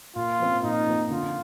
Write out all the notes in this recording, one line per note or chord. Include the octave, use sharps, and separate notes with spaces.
A#2 F4
F3 C4
A#2 D#4
F3 C4
D3 F4